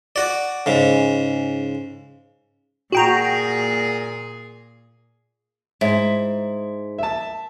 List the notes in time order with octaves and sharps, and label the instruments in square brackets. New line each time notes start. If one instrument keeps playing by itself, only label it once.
[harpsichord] F#4 D5
G#2 C#3
[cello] A#2 G#4 [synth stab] F#4 G5 A#5
[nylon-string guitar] G#2 [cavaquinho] E4
[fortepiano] E5 A5